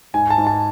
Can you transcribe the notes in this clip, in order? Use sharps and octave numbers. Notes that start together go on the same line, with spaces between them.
G#2 G#5
A5
G#2
A5